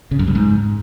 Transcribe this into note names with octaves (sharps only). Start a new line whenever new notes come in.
C#3
F#2
G2
G#2